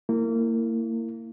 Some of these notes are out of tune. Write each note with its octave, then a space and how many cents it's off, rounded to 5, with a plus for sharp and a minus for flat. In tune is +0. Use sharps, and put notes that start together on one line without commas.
A#3 -25 E4 +0